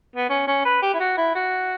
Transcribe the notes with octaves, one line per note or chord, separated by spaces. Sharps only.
B3
C#4
C#4
B4
G4
E4
F#4
E4
F#4